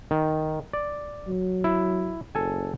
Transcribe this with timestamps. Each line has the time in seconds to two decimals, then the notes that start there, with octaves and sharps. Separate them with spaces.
0.11 D#3
0.73 D5
1.28 F#3
1.64 E4
2.35 F#1 A4 G#5